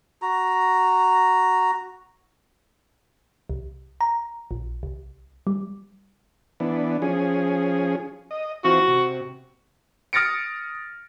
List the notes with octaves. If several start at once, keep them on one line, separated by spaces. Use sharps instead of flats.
F#4 A#5
C2
A#5
A#1
C2
G3
E3 B3 D4
F3 C#4 G#4
D#5
E3 C4 F4 F#4
C3
D#6 F6 A6 A#6 C#7 D7